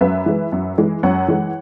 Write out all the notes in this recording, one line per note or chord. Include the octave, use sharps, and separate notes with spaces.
F#2 B4 E5
E3 G#3
F#2
E3 G#3
F#2 C#5 F#5
E3 G#3